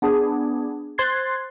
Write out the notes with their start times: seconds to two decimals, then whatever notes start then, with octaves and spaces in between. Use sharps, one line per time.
0.02 B3 D4 G#4
0.98 C5 C6 F#6 G#6 A6 C7